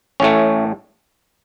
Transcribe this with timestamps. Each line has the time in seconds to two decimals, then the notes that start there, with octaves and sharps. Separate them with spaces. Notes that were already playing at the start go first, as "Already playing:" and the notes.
0.20 A1 A2 A3 C#4